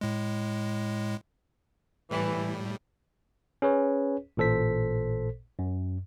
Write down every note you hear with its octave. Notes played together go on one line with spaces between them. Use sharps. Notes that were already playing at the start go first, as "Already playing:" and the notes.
A2 G#3
A2 E3 G3
C#4 G#4 B4 C#5
A1 A#2 A4 C5 B6
F#2